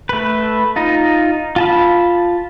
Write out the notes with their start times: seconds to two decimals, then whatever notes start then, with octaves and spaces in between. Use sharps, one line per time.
0.09 A3 B4
0.76 D#4 F4
1.56 F4 A5 B5